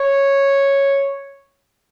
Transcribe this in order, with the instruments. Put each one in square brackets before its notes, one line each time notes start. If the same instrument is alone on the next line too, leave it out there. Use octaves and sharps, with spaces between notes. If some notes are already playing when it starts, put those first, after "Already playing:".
Already playing: [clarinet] C#5